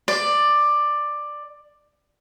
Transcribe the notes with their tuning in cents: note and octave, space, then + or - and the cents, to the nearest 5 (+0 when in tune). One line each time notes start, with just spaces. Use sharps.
D5 +10